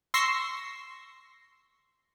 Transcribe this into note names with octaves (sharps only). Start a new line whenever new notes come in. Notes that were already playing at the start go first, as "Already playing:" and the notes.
C6 C#6 E6 A#6 C7